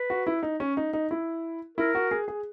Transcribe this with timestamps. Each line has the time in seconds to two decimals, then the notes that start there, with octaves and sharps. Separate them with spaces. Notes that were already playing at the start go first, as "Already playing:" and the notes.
Already playing: B4
0.10 F#4
0.27 E4
0.43 D#4
0.60 C#4
0.77 D#4
0.93 D#4
1.11 E4
1.78 E4 A#4
1.95 F#4
2.11 G#4
2.28 G#4